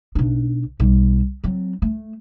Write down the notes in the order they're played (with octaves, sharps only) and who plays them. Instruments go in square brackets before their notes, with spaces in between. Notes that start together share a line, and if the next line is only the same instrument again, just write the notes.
[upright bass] B1 D4
B1 G3
F#3 C4
A3